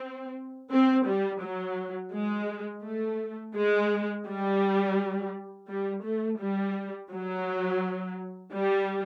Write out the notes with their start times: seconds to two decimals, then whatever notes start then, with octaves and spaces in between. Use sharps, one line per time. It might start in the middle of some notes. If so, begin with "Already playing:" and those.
Already playing: C4
0.71 C4
1.06 G3
1.41 F#3
2.13 G#3
2.84 A3
3.55 G#3
4.26 G3
5.68 G3
6.04 A3
6.40 G3
7.11 F#3
8.53 G3